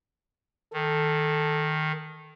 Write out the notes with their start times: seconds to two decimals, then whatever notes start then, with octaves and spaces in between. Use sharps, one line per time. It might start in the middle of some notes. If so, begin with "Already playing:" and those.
0.73 D#3 A4